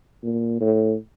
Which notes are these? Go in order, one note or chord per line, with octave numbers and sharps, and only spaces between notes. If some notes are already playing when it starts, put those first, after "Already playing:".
A#2
A2